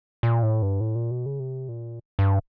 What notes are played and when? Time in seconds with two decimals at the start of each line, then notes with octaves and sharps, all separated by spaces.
0.23 A#2
0.43 A2
0.62 G2
0.81 A2
0.95 A#2
1.11 B2
1.26 C#3
1.40 C3
1.69 A#2
2.19 G2